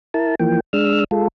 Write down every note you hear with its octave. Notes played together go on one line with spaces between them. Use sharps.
E4 A#4 A5
E3 F3 A#3 G5
G#3 D4 E6 F6
G#3 F4 A4